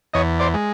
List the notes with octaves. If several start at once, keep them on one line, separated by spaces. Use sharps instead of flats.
E2 C#5 D#5
C5 D5
G#3